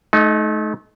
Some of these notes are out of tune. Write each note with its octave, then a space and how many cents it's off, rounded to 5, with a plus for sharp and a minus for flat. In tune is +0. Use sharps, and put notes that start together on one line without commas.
A3 -35 D#4 +5